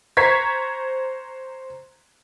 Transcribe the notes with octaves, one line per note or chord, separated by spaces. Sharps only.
C5 A#5 C#6 G#6 B6 C7